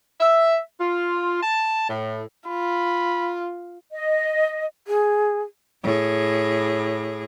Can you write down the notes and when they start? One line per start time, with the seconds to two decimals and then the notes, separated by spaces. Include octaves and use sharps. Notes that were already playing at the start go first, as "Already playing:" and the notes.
0.20 E5
0.80 F4
1.43 A5
1.88 A2
2.48 F4 B5
3.92 D#5
4.88 G#4
5.83 A2 G#4